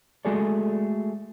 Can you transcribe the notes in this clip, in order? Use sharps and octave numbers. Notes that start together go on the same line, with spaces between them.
G#3 A3 F#4 G#4 A4 D5